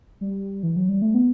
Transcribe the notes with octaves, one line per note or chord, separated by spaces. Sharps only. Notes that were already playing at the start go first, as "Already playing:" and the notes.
G3
E3
F#3
G3
A3
B3